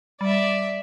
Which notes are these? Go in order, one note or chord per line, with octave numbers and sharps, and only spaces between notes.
G3 D5 E5